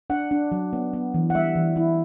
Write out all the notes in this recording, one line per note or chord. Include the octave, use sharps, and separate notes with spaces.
D4 F#5
D4
F#3
B3
B3
E3
F#5
G3 E5
E3
E4